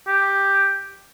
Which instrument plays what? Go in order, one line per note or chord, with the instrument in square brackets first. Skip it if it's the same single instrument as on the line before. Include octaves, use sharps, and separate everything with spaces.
[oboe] G4